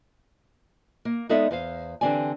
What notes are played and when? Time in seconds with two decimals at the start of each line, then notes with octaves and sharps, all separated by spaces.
1.05 A#3
1.29 G#3 B3 D#4 A4 D5 E5
1.51 E2 C5 F5
2.01 D3 E3 C4 G4 D5 G#5